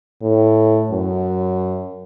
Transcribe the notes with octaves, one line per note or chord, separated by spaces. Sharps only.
A2
F#2